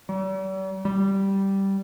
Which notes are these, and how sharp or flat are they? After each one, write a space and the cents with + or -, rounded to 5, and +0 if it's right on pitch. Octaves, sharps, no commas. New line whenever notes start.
G3 -45
G3 -5